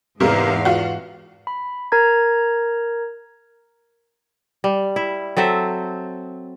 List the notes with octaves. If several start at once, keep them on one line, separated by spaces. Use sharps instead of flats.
E2 G#2 C3 G#3 A#4 F5
F4 F#4
B5
A#4 A#5 G#6
G3
E4
F#3 C4 A4 E5